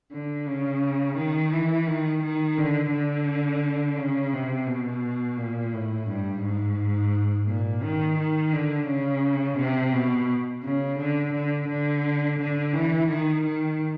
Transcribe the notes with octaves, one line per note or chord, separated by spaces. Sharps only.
D3
C#3
D#3
E3
D#3
D#3
D3
D3
C#3
C3
B2
A#2
A2
G2
G#2
A#2
D#3
D#3
D3
C#3
C3
B2
C#3
D3
D3
D3
D3
E3
D#3
D#3